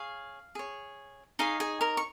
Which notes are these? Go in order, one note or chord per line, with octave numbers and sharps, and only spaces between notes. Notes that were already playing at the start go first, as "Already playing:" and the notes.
Already playing: G#4 C#5 F5
G#4 C#5
D#4 G#4 C#5 F5
G#4 G#5
A#4 A#5
C#6